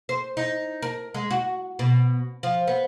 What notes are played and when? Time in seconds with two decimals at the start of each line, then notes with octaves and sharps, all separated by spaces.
0.09 C5
0.37 D#4
0.82 A#4
1.14 G#3
1.31 F#4
1.79 B2
2.43 F3
2.68 B3